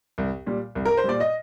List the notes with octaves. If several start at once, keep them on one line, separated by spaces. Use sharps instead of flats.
C2
A#2 G3
C2
A#4
C5
A#2 G3 D5
D#5